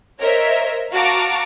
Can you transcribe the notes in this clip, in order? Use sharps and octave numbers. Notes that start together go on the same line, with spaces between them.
A#4 C5 C#5 D#5 E5
F#4 F5 A5 A#5 C#6 D6